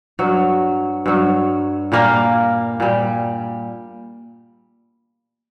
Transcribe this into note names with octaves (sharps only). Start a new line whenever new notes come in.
G2 F#3
G2 F#3
A#2 G3 A#3
A#2 G3